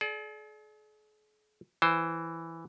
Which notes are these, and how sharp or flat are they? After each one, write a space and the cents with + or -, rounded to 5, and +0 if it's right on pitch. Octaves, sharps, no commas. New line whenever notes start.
G#4 +45 D5 +0
E3 +0 C5 +0